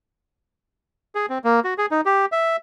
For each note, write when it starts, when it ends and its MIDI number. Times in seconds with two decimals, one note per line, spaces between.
1.15 1.26 68
1.29 1.38 60
1.44 1.60 58
1.64 1.74 66
1.78 1.86 68
1.91 2.01 63
2.06 2.26 67
2.32 2.56 76